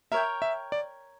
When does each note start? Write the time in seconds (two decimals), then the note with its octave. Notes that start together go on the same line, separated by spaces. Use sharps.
0.12 A#4 C#5 E5 G5
0.42 E5
0.72 D5